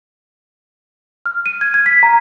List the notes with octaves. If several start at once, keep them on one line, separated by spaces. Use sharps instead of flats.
F6
D#7
G#6
G#6
B6
A#5